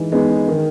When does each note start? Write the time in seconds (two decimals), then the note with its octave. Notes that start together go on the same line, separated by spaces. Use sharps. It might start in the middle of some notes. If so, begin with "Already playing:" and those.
Already playing: E3 G#3 D#4
0.12 G#3 B3 D#4
0.48 D#3